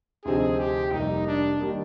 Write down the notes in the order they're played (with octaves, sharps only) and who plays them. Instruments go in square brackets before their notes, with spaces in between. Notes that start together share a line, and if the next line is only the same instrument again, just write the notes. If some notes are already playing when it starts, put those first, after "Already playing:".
[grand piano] D2 C3 F3 C4 D#4 [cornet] G#4
[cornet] G4
[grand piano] F1 F2 C3 G3 A#3 [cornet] D#4
[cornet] D4
[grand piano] D#3 G3 A#3 D#4